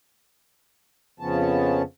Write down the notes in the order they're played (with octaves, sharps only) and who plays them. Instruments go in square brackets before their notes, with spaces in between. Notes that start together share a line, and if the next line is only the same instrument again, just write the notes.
[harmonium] F2 C#3 F3 B3 C#4 A5